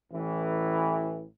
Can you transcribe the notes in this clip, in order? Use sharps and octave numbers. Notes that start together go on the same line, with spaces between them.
A1 A2 E3